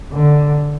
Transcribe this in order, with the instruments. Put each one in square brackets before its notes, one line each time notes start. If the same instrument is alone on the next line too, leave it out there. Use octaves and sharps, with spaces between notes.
[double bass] D3